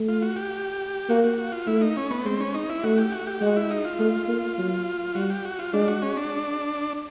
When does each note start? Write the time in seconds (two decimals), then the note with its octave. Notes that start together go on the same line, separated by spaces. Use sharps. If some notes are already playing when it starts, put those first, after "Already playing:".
Already playing: A3
0.08 F4
0.22 F#4
0.36 G4
1.09 A#3 F#4
1.24 F#4
1.38 F#4
1.52 F4
1.67 A3 E4
1.81 D#4
1.97 C#4
2.11 B3
2.25 G#3 C4
2.40 C#4
2.55 D#4
2.69 E4
2.84 A3 F#4
2.98 G4
3.12 F#4
3.27 G4
3.41 G#3 F#4
3.56 E4
3.70 D#4
3.85 F4
3.99 A3
4.28 A#3
4.58 F#3
5.15 G3 F#4
5.30 G4
5.45 F#4
5.59 F4
5.73 G#3 D4
5.88 F#4
6.02 C#4
6.17 D4